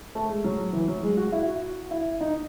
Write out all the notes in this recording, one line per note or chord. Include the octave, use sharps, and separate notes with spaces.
A3
G#3
F#3
E3
F#3
G#3
F#4
E4
F#4
E4
D#4